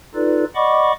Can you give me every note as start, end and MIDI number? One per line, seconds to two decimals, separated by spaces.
0.15 0.44 63
0.15 0.44 65
0.15 0.44 69
0.15 0.44 71
0.15 0.44 74
0.55 0.92 74
0.55 0.92 75
0.55 0.92 78
0.55 0.92 83
0.55 0.92 85
0.55 0.92 86